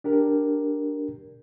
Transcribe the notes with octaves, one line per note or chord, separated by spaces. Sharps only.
D4 G4 A#4